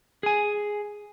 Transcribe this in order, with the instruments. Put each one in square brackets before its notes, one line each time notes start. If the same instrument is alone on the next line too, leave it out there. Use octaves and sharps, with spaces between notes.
[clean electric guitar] G#4 G#5